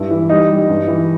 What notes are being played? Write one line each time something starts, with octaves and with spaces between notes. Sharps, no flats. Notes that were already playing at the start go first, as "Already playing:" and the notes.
Already playing: G2 E4
E3
G3 D#4
G3
G2
E3